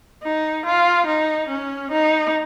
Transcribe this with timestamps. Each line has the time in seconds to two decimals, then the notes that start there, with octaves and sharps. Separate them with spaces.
0.23 D#4
0.66 F4
1.07 D#4
1.49 C#4
1.92 D#4